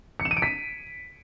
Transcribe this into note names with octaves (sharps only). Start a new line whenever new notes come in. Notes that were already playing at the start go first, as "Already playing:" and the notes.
C#7
E7
D#7
D7
B6